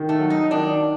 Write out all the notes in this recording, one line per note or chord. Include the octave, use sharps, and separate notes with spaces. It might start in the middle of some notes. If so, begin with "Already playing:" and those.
Already playing: D#3
A3
F#3
D#4
D#3 D4